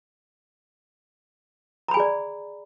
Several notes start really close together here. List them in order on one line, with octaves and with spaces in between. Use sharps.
A#5 B5 G#5 G#4 D5